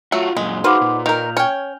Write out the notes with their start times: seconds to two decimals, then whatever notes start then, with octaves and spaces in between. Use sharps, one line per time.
0.12 F#3 A3 F4 F#4
0.37 F#2 A#2 G#3
0.64 D#4 F#4 G#4 B4 C5 F5 F#5 D6
0.81 A#2
1.06 D#3 A#4 F6 G6 F7
1.37 C#4 C#5 G5